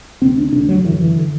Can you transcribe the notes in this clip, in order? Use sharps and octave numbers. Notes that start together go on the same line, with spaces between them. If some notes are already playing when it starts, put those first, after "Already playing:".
D2 C3 C4
D4
D2 C3 D4
F#3
F#2 D3 E3
E3
D3